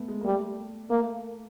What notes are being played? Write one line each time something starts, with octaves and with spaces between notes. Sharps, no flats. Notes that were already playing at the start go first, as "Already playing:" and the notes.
Already playing: A3 B3
G#3
A#3
G3 A3
A3 A#3